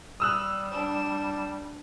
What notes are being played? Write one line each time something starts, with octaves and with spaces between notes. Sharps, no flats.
G3 D#6 E6 F#6 F7
D4 E7